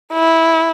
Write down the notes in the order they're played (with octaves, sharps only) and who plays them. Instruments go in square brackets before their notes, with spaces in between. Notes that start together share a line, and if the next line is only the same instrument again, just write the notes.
[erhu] E4